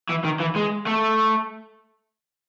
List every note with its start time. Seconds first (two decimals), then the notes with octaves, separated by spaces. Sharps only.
0.10 E3
0.25 D#3
0.40 E3
0.56 G#3
0.86 A3